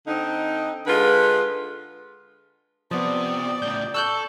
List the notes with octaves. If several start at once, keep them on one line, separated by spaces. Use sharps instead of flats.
D3 C4 D#4
D3 G#3 F4 B4
C3 F3 B3 D5 D#6
A2 C#3 G6
A4 C#6 E6 F#6 G6